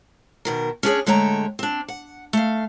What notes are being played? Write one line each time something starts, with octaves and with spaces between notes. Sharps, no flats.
B2 D#3 A#4
C#4 D4 G#4 C#5
D3 G#3 A3 C#5 G5 A#5
C4 D4
F#5
A3 F5